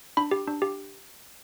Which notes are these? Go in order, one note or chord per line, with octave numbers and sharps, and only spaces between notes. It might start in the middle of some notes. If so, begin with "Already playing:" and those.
D4 B5
G4
D4
G4